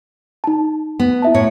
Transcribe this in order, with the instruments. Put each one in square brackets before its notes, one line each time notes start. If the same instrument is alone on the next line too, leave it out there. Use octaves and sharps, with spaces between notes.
[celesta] D#4 A5
[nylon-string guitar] B3
[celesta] E4 E5 A5
[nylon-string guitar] A2 C#5